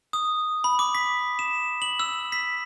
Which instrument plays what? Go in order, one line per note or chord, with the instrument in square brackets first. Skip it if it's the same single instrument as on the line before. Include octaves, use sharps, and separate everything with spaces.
[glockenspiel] D#6
B5
D6
B6
E7
F#7
E6
B6